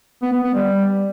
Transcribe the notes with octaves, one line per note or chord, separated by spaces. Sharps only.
B3
B3
B3
G3